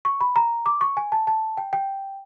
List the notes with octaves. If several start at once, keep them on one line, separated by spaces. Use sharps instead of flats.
C#6
B5
A#5
D6
C#6
G#5
A5
A5
G5
G5